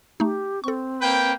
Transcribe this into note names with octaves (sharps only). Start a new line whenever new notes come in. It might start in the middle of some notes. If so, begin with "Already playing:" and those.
A3 D#4 G4
C4 A4 C#6
A#3 B4 G5